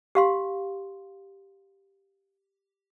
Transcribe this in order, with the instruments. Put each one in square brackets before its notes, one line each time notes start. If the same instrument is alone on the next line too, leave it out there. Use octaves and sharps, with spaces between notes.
[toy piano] G4 F5 C6